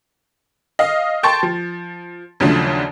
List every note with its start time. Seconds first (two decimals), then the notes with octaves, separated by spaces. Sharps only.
0.79 D#5 F5
1.23 G5 A5 C6 C#6 A6
1.43 F3
2.40 D#2 C#3 F3 F#3 A3 D4